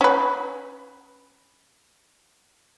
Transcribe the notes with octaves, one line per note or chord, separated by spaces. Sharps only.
C#4 B4